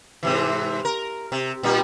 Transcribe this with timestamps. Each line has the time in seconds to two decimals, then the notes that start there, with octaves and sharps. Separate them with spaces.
0.23 G#2 C3 E3
0.85 A#4
1.32 C3
1.63 A#2 G3 D#4